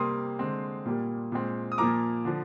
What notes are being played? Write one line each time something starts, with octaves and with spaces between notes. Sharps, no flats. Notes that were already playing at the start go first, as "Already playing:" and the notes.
Already playing: C3 G3 A#3 C6 D#6
D3 G#3 C4
A#2 G3 A#3
A#2 G#3 C4
D#6
A#2 F3 A#3 A#5 D6
D3 F3